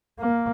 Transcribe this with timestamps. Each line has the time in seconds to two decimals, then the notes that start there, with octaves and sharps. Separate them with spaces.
0.20 A#3